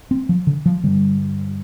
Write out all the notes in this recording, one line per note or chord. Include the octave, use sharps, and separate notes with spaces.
C4
F3
D3
F3
G2 D3 G3